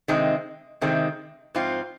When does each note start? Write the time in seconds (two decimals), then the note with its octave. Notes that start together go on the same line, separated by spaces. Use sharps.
0.08 C3 D#3 G#3 C4 D#4
0.81 C3 D#3 G#3 C4 D#4
1.55 G#2 F3 C4 F4